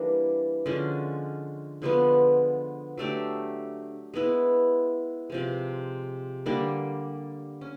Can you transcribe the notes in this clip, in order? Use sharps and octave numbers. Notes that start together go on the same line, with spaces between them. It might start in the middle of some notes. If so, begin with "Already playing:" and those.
Already playing: E3 G3 A#3 D4
D3 F3 G#3 C#4
D3 F3 G#3 B3
F#3 A3 D4 G4
G#3 B3 E4
C3 F3 G#3
D3 G3 A#3 D4
C#4